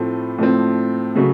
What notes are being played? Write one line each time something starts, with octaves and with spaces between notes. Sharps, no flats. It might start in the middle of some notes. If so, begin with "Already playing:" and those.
Already playing: A2 F3 A3 C4
A2 F3 A3 C4
C#3 F#3 A3